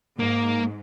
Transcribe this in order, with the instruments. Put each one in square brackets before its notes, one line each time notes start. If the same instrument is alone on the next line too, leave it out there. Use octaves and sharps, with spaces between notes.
[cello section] G#2 [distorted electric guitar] A#3